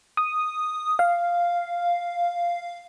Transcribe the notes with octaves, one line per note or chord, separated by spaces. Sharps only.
D#6
F5